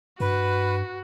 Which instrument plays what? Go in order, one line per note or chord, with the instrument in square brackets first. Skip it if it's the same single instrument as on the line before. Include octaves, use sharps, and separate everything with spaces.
[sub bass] G2 [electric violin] F#4 [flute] B4